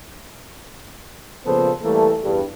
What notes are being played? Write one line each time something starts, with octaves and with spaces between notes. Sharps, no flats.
A#2 C#3 F3 B3 A4 C5
E3 G3 A3 A#3 A4
E2 G2